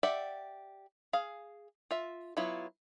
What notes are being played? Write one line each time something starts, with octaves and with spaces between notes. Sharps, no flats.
G4 D5 E5 F#5
G#4 F5
F4 E5
F#3 B3 E4 F4